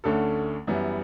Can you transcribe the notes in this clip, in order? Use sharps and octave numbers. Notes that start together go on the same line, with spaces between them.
D2 D3 A3 C#4 A4
F#2 E3 G3 B3